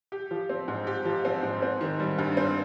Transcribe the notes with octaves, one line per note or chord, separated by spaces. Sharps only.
G4
F3
C4
G#2
G4
F3
C4
G#2
C4
D#3
G3
G2
C4